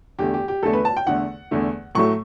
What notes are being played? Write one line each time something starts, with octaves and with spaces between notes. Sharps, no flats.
E2 D3 A3 G4
G4
G4
E2 D3 A3 A4
B4
A5
G5
E2 D3 A3 F#5
E2 D3 A3
A2 F#3 A3 C#6